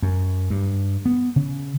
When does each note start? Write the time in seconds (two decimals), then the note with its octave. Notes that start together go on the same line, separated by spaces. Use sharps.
0.02 F#2
0.50 G2
1.06 B3
1.36 C#3